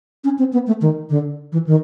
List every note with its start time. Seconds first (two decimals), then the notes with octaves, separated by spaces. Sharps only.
0.24 C#4
0.39 C4
0.53 B3
0.67 A3
0.82 D#3
1.10 D3
1.52 E3
1.67 D#3